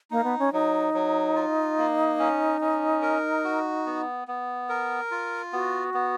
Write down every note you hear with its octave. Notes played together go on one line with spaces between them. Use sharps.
A#3 D#4
B3
C#4
F#3 D#4
F#3
F4
A#3
C#4
C#4
A#4
F#4
B3
B3
A#4
F4
B3 F#4
B3